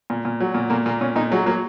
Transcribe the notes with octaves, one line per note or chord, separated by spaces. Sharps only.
A#2
A#2
F#3
A#2
A#2 A#3
A#2 A#3
A#2 C#4
A#2 D#4
F#3 G#3
F#3 A#3